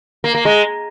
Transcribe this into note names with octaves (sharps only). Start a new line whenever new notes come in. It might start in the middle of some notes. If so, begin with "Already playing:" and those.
A#3
A#3
G#3